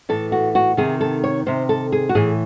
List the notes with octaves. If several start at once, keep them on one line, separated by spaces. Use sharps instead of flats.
A2 E3 A4
F#4
F#4
C3 D#3 G#4
A4
C#5
C3 D#3 C5
A4
G#4
F#4
A2 E3 G#4